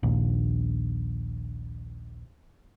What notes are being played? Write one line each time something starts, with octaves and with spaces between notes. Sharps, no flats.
A#1 D#2